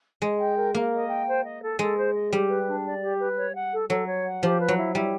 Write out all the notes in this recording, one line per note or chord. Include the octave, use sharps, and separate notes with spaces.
G#3 D#5
G5
A#4
A#3 A#4
D#5
G5
C5
D#5
A4
G#3 A4
C5
D#5
G3 G4
B4
D4
D5
G4
B4
C#5
F#5
A4
F#3 A4
C#5
F#5
F3 G4
B4
F#3
E4
G3 E4